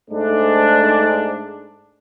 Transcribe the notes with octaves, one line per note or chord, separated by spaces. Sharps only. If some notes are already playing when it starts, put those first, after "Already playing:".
G#2 A3 D4